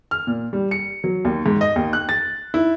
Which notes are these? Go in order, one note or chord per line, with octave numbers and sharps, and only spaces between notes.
F6
A#2
G3
C#7
F#3
D#2
G#2
D#5
D#2
F#6
A6
E4